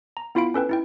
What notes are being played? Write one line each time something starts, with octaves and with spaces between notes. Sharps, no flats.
A#5
B3 E4 F4 F5 B5 D7
C#4 A4 B4 G5
D#4 E4 G5